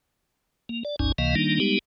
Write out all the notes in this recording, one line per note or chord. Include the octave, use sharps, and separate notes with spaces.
A#3
D5
G1 C#2 G2 C#4 D#4 G#5
C#2 C3 E3 A#3 D#5 F5
D#3 G3 A#3 D4 D#4
G3 G#3 B3 D#4 G4